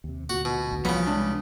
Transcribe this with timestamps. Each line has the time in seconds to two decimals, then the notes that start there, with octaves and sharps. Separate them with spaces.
0.04 D#2 C3
0.30 D2 A#2 F#4
0.45 B2
0.71 A1 D2 D3
0.85 C2 C#3 E3 F3 A#3 B3 C#5 B5
1.07 G#3 D4